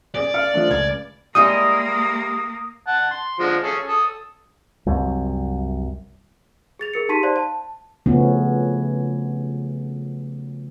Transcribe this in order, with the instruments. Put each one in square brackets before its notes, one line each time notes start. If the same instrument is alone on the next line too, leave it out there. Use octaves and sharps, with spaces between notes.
[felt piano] C#4 G#4 [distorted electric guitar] D5
[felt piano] F5 F6 C#7
F3 A3 D4
C#2 G#6
[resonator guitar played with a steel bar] G3 G#3 E4 [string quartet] A#3 [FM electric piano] D#6
[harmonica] F#5 A5
C6
D3 F3 G#3
C#4 G#4 A4
A4 D#6
[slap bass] C2 F#2
[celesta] G#4 A6 F7
G#4 A#4 C#7
D#4 G4 A5 C6 B6 D#7
C5 D5 F5 A5 C6
A5
[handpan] C#3 F3 A3 B3 C#4